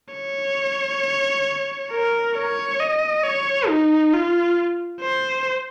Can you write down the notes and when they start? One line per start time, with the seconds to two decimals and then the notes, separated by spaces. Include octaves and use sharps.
0.14 C#5
1.91 A#4
2.35 C#5
2.80 D#5
3.24 C#5
3.69 D#4
4.14 F4
5.01 C5